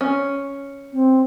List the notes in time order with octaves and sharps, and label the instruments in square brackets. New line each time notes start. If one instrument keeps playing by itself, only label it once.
[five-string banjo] C#4
[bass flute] C4